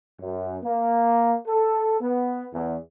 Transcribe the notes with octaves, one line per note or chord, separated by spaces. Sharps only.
F#2
A#3
A4
B3
E2